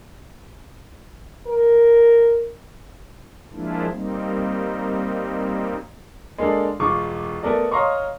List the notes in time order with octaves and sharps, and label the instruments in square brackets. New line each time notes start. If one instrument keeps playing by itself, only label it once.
[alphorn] A#4
[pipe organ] F3 G#3 A#3 D4 E4 F4
G3 A#3 C4 D#4
[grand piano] G#3 A#3 D4 A4
E1 F4 C#6 D6
A3 B3 A4 A#4 D5
C#5 D#5 F5 A#5 C6 C#6